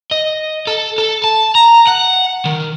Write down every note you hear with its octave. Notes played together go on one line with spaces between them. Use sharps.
D#5
A4
A4
A5
A#5
F#5
D#3